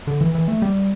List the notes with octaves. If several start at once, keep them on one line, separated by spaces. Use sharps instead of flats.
D3
E3
E3
A3
G3